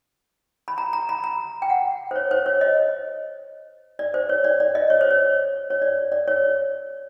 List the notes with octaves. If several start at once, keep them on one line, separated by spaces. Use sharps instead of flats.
B5
A#5
A#5
B5
A#5
G5
F#5
C5
C#5
C5
C#5
D#5
D5
C5
C#5
D5
D5
D#5
C#5
C5
C#5
C#5
D5
D5
C#5